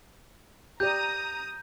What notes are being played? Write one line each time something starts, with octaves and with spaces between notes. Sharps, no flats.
G4 D5 A#5 D#6 G6